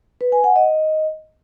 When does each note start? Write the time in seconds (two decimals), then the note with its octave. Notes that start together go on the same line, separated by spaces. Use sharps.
0.21 B4
0.32 G#5
0.44 F#5
0.56 D#5